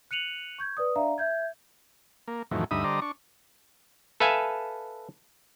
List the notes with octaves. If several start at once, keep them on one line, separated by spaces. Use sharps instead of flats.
F#6 C#7 D#7 F7 F#7
C#6 G6 G#6
B4 D5 D#6
D4 D5 E5 F5 A#5
E5 G6 G#6
A#3
F2 A2 D#3 E3 F#3
D2 G2 D#4 E5 B5 D#6
D3 G3 C5 D5 D#5 A#5
D4 C#6
A4 B4 E5 F5 G#5